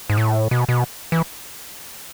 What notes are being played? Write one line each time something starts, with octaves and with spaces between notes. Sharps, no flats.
G#2
A2
B2
B2
E3